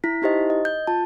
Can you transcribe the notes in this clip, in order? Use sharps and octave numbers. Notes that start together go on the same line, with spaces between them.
E4 B6
D#4 E4 G4 C5 D#5
D#5
G6
F4 A5